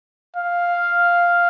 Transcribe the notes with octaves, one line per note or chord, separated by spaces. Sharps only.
F5